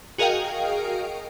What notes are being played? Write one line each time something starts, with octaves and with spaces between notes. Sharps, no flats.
F#4 G#4 A#4 D#5 F5 G5